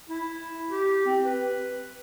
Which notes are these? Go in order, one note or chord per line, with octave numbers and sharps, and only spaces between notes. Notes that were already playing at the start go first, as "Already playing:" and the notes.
E4
G4
C4
B4